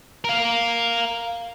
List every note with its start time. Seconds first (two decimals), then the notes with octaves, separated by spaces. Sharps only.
0.25 A#4 F5